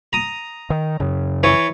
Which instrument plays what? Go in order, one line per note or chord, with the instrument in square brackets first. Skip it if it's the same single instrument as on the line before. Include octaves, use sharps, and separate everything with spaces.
[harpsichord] A#5 D#6
[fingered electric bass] D#3
F#2 C#3
[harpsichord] E3 C#5